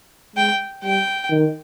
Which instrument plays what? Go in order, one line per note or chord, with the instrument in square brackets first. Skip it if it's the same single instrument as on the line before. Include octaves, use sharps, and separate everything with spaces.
[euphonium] G#3 [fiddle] G5
[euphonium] G3 [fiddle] G5
[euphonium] D#3